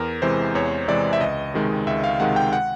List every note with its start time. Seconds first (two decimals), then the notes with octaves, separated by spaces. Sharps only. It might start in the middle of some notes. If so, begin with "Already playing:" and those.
Already playing: E2 A#4
0.22 C3 E3 G#3 C5
0.55 E2 C#5
0.88 C3 E3 G#3 D5
1.13 E5
1.20 C#2 D#5
1.54 C3 D#3 G#3
1.87 C#2 E5
2.04 F5
2.20 C3 D#3 G#3 F#5
2.36 G5
2.53 F#5